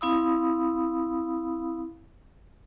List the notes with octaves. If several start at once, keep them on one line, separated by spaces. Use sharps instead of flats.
C4 E4 F5 B5 D#6 E6